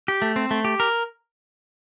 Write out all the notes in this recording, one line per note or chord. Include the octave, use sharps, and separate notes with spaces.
G4
A3
C4
A3
G4
A#4